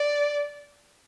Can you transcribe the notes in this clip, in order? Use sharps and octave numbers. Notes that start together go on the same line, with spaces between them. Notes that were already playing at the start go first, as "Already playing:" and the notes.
Already playing: D5